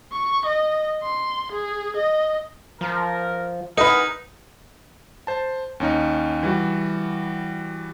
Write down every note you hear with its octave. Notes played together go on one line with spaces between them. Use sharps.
C#6
D#5
C6
G#4
D#5
F3 A#4
D#4 G#4 A#4 B4 F#5 B5
C5 A5
D#2 C#4 D#4
E3 G3 F#4